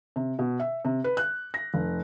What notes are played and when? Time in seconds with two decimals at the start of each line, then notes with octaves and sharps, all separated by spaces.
0.16 C3
0.39 B2
0.60 E5
0.85 C3
1.04 B4
1.17 F#6
1.54 A#6
1.74 F1